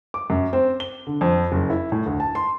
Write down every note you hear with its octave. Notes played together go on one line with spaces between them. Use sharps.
D6
F#2
C4
G7
D3
F2
F#1
E4
A2
D2
A5
C6